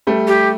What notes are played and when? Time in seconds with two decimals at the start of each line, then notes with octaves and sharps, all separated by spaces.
0.07 G3 A3
0.27 G4